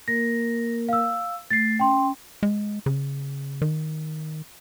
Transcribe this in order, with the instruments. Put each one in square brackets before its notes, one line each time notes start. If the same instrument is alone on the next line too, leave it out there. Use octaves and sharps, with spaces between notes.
[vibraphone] A#3 A#4 [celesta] A#6
[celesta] F5 E6
[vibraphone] A3 [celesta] A6 C7
[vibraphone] C#4 [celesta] G5 C6
[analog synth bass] G#3
C#3
D#3